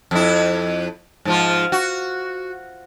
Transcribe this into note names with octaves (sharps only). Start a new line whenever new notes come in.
F2 E4
G#2 F3 F4
F#4